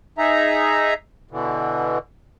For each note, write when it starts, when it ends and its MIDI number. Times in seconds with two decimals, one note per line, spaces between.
0.18 0.94 63
0.18 0.94 68
0.18 0.94 76
0.18 0.94 82
1.31 1.98 47
1.31 1.98 50
1.31 1.98 52